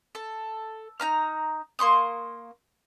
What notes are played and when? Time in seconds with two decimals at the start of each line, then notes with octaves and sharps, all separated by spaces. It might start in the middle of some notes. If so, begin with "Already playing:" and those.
0.15 A4
1.00 D#4 A#5 F6
1.79 A#3 C6 C#6 D#6